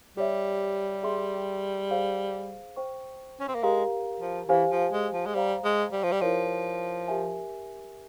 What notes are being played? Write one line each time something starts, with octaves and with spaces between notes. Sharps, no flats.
G3 G4 C#5 E5
G#4 E5 G5 C6
G#4 C5 F5
C5 G5 C#6
C#4
C4
A#3
G#3 G4 A#4 F5 A#5
F3
E3 G4 C5 F5 G#5
F3
G#3
F3
G#3
G3 C5 F5 A#5
G#3
G3
F3
G3
F3 E4 G4 A#4 C#5
G4 A#4 E5 G#5